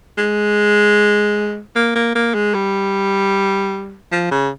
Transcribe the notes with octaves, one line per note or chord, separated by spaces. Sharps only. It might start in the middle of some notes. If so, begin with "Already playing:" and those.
G#3
A#3
A#3
A#3
G#3
G3
F3
C#3